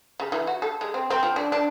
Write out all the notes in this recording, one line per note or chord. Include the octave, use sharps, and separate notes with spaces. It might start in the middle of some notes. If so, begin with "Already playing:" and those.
C#3
E3
F#4
A4
G#3
C4
C4
F3
D4
D4